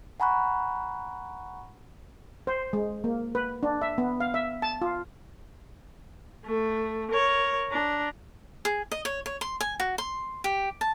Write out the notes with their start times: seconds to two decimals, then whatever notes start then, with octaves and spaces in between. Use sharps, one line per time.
0.20 F#5 G#5 A#5 B5 C#6 F#6
2.47 C5
2.73 G#3
3.04 A#3
3.35 B4
3.63 D4
3.82 E5
3.98 B3
4.20 F5
4.34 E5
4.62 A5
4.82 F4
6.45 A3
7.11 A#4 C#5
7.71 D4 A#5
8.65 G#4
8.91 D#5
9.05 C#5
9.26 C#5
9.41 C6
9.61 G#5
9.80 F#4
9.98 C6
10.44 G4
10.81 A5